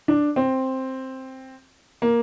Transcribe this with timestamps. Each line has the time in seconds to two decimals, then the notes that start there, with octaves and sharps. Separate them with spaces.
0.08 D4
0.36 C4
2.02 A#3